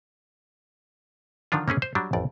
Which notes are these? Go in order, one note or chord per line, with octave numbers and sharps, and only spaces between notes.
D3 D#3 F3 D4 F4
A#3 C4 C#4 G#4
C5
F#3 G3 D4
A1 F2 D5